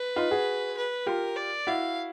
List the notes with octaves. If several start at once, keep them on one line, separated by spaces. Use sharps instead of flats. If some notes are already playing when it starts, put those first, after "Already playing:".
Already playing: B4
D#4 F4
F#4 G#4
B4
F4 G4 A#4
D5
E4 F#4 F5